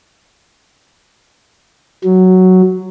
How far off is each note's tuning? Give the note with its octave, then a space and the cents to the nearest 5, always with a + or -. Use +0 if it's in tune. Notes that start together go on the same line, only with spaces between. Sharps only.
F#3 +5